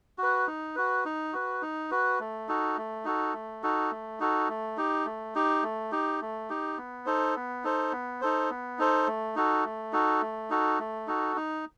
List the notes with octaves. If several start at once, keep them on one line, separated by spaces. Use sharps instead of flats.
F#4 B4
D#4
F#4 B4
D#4
F#4 B4
D#4
F#4 B4
A3
D#4 F#4 A4
A3
D#4 F#4 A4
A3
D#4 F#4 A4
A3
D#4 F#4 A4
A3
D#4 G4
A3
D#4 G4
A3
D#4 G4
A3
D#4 G4
B3
D#4 A4 C5
B3
D#4 A4 C5
B3
D#4 A4 C5
B3
D#4 A4 C5
A3
D#4 F#4 A4
A3
D#4 F#4 A4
A3
D#4 F#4 A4
A3
D#4 F#4 A4
D#4